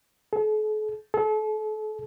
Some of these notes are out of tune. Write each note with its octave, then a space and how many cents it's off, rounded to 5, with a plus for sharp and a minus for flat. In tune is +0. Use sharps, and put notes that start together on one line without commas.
A4 -45
A4 -35